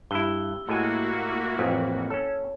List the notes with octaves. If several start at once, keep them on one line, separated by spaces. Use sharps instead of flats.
G2 E4 G4 E6 G7
A2 G#3 A#3 E4 F#4 G#5
A1 F2 A#4 C5 B6
C#4 A4 C#5